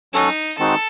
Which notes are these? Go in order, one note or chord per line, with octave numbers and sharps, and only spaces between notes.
F#3 C#4 D#4 F#4 A4
D#3 G#3 C4 D#4 F#4 A4